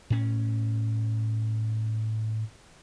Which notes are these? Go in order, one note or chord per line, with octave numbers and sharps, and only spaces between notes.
A2 C#4